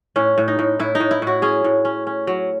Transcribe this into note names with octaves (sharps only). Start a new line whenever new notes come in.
A2 C#4
A2
D#4
A2
A2 E4
D#4
A2
E4
A2 F#4
C#4 G#4
A2
C#4
C#4
F#3